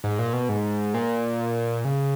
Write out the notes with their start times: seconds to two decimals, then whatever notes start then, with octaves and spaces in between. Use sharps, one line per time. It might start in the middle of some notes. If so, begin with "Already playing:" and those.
0.04 G#2
0.19 A#2
0.33 B2
0.49 G#2
0.94 A#2
1.85 C#3